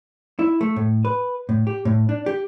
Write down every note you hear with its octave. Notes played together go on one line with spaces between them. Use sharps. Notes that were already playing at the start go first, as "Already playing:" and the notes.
E4
A3
A2
B4
A2
G4
A2
D4
G4